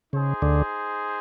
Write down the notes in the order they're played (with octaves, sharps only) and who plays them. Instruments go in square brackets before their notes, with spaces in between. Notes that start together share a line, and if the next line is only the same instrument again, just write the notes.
[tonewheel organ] C#3 [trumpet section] D#4 G#4 C5
[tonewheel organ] D2 D3